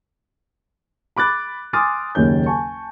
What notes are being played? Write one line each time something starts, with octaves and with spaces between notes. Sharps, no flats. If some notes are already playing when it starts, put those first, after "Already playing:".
B5 D6 F#6 A6
G#5 C6 D6 D#6 F6 A6
F#1 D#2 D#3 C#4 G6
G#5 A5 C#6